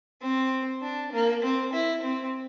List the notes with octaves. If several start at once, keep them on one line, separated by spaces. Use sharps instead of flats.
C4
D4
A#3
C4
E4
C4